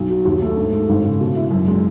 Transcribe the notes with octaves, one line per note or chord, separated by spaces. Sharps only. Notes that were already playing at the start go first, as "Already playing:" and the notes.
Already playing: B1
F#3
D#2
A3
G#2
G#3
G#1
C#3
B2
E4
F#2
G#3